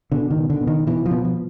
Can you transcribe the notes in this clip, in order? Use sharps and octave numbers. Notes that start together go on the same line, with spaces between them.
B2 D3
D#3
B2
D3
B2
D#3
B2 E3
F3
B2
F3